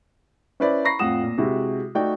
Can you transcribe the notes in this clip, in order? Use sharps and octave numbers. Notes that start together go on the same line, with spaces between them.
C#4 E4 B4 C5 D5
A#5 B5 C#6 A#6 C7
F2 A2 F4 F#5 D#6 E7
A#2
C3 G#3 E4 F#4
A3 D#4 F#4 D5 G5